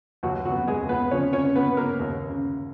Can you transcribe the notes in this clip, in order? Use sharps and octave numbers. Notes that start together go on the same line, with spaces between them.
D#2 F#3 F#4
F#3 F#4
B3
G#3 G#4
D#2
B3 B4
F3 C#4 C#5
C#4 C#5
C#3
B3 B4
B3
A#3 A#4
D#2
C#3